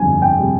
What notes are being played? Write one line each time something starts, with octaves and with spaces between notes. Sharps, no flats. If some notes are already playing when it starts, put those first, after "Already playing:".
Already playing: G1 F2 G3 G#5
G5
C3 G3